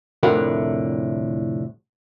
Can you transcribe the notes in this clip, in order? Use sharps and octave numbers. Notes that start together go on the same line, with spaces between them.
C2 F2 A2 D3 A#4 F#5